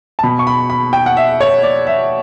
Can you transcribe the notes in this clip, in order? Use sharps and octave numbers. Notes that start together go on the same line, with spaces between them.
A5
B2 B5
C#6
B5
B5
G5
F#5
E5
C#5
D5
E5